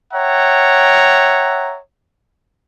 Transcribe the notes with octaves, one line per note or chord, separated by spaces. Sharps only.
C#5 E5 F#5 G5 A#5